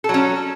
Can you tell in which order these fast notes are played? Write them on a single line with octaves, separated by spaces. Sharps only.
A4 F#3 C#4